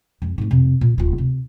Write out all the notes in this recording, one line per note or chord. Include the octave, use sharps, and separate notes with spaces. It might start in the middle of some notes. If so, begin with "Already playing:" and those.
F2 G#3
G#2 A3
F2 C3
A#2
D1 F4
C3